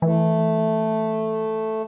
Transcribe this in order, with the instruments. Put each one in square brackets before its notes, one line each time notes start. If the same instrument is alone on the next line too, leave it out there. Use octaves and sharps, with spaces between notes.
[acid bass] E3 [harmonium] A3